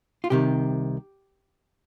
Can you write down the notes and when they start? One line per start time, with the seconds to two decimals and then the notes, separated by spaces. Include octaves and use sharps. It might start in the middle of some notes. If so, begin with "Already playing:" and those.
0.24 F4
0.30 C2 C3 D#3 G4